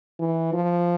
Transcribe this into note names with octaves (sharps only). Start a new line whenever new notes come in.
E3
F3